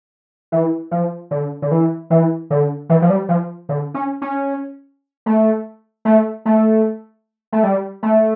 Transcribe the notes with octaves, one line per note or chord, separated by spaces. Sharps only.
E3
F3
D3
D3
E3
E3
D3
E3
F3
G3
F3
D3
C#4
C#4
A3
A3
A3
A3
G3
A3